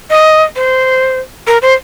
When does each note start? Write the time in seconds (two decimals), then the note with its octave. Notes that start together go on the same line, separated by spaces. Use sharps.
0.10 D#5
0.56 C5
1.47 A#4
1.62 C5